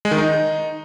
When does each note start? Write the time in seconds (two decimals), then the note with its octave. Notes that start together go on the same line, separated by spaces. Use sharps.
0.05 G#3
0.11 D#3
0.18 D#4